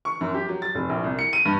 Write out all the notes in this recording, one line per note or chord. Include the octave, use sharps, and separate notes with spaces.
C#6
F#2
G4
F#3
A6
F1
A#1
C2
C#7
D#7
G2